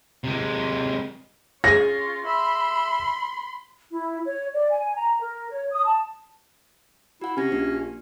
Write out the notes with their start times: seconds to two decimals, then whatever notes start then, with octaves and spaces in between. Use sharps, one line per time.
0.24 C3 G#3
1.64 C#4 F4 G#4 C#5 A#6
2.26 E5 B5 C6
3.91 E4
4.25 C#5
4.53 D5
4.70 G#5
4.96 A#5
5.21 A#4
5.51 C#5
5.72 D#6
5.85 A5
7.22 E4 F#4 F#5
7.37 C3 C#4 G4 G#6 A#6
7.52 A#1 D4 F#4